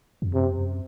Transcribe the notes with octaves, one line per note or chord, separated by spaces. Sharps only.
F2
F#2 C3
F2
F#2